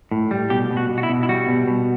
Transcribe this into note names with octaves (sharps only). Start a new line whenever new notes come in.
A2
G3
B2 G4
B2
F#4
B2
F#4
E4
B2
E4
G3 F#4
B2
B2